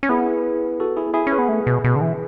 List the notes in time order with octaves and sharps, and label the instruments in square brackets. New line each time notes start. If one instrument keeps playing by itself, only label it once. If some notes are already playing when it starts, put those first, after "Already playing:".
[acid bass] C#4
[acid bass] B3 [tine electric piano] E4 G#4
[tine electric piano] F#4 A4
E4 G#4
E4 G#4
[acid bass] C#4
[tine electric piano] G#4 B4
[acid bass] B3
A3
B2
B2
D3
E3